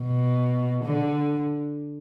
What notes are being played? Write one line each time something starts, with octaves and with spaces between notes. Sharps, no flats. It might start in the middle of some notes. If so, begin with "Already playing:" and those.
Already playing: B2
D3